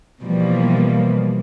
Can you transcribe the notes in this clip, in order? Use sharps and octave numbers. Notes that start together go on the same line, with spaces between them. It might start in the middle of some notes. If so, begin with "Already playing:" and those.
B2 E3 F3 G3 A#3